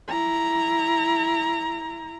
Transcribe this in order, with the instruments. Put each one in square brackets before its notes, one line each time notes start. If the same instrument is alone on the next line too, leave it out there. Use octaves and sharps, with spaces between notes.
[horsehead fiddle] E4 A#5